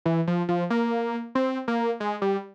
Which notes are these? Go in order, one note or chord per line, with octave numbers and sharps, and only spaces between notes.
E3
F3
F3
A#3
C4
A#3
G#3
G3